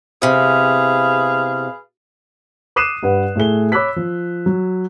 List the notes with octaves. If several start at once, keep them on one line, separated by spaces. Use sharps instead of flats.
E2 C3 G#4 B4 F5
D6 D#6 F#6 C7 D#7 E7
G2 B4 F#5
A2 A3 G#4 G7
C#5 B5 D6 E6 F#6 B6
F3
F#3